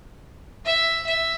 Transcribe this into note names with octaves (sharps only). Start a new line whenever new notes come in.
E5
E5